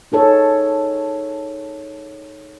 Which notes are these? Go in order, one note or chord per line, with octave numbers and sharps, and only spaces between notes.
D#4 G#4 A4 C#5